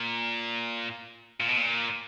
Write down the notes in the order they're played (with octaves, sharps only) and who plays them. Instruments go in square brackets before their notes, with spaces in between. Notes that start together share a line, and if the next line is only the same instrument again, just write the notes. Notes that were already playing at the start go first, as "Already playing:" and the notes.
Already playing: [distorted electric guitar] A#2
A#2
B2
A#2